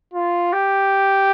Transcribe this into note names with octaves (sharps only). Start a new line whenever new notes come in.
F4
G4